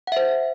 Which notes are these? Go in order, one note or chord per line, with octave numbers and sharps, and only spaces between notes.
C5 E5 F#5